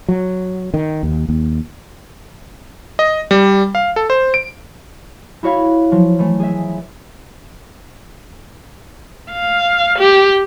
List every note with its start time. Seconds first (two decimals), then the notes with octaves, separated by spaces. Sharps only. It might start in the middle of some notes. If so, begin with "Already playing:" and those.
0.08 F#3
0.74 D#3
1.03 D#2
1.29 D#2
2.99 D#5
3.31 G3
3.75 F5
3.96 A4
4.10 C5
4.34 D7
5.43 E4 F#4 C#5 F5 B5
5.92 F3 F#3
6.19 E3 A3
6.40 G#4 E5
9.32 F5
9.99 G4